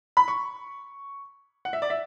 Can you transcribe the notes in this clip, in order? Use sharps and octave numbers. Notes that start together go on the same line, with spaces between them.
B5
C#6
F#5
E5
D5
E5